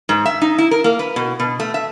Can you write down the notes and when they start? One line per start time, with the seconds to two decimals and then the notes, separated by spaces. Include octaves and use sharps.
0.09 G#2
0.25 E5
0.42 D#4
0.58 E4
0.71 A#4
0.84 A#3
0.99 B4
1.16 B2
1.40 B2
1.60 A3
1.74 E5